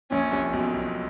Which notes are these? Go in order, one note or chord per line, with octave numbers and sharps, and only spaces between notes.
A#1 A#2 C#4
C2 C3
B1 B2
B1 B2